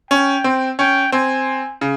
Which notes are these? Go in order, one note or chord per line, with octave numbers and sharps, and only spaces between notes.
C#4 G5
C4
C#4 G5
C4 G#5
C#3